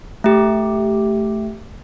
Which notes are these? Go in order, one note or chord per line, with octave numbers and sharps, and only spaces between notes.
A3 G4